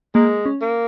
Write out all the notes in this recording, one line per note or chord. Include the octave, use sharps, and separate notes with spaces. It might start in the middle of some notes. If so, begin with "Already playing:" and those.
G#3 A#3
C#4
A#3